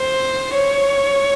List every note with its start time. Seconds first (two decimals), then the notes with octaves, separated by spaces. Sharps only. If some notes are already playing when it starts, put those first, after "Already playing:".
Already playing: C5
0.55 C#5